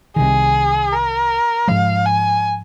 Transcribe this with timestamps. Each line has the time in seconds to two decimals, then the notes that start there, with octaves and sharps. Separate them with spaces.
0.16 C2 C3 D#3 G#4
0.92 A#4
1.68 G#2 F3 G#3 F5
2.06 G#5